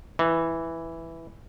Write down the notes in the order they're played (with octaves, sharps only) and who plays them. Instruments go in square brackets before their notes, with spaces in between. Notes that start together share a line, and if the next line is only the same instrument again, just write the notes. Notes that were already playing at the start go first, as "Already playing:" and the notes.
[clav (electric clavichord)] E3